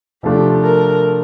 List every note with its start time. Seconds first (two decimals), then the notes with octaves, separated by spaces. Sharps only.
0.23 C3 F3 A3 D4 F4 G4
0.63 A#4